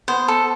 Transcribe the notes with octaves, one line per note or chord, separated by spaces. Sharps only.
B3 C5
A4